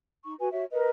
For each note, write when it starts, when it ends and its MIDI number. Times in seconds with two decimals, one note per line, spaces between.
0.24 0.34 63
0.24 0.34 85
0.39 0.47 66
0.39 0.47 71
0.39 0.47 80
0.51 0.64 66
0.51 0.64 73
0.51 0.64 76
0.71 0.89 70
0.71 0.89 71
0.71 0.89 75